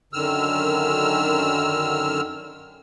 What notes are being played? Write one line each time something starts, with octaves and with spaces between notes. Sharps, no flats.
F#2 D3 D#3 E6 F6